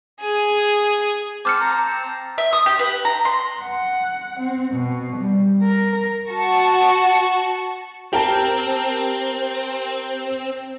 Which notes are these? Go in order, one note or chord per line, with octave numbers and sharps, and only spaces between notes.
G#4
C4 C5 A5 D6 F6 C#7
A#5
E5
D#6
G4
B4
A#5
C6
F#5
C4
B2
G3
A#4
F#4 A5 C#6
C4 G4 A#4 A5